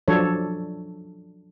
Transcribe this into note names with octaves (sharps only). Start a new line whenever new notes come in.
F3 F#3 D4 A4 C#5